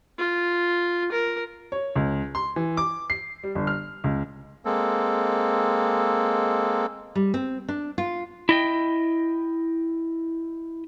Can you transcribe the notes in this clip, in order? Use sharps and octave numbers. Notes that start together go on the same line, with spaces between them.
F4
A#4
C#5
C#2
C6
E3
D6
C7
G3
G1
F6
C#2
G#3 A#3 C4 A4
G3
C4
D4
F4
E4 D#5 G5